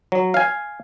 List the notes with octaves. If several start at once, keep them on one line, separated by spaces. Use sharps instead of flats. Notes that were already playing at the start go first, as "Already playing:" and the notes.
F#3
F5 G#5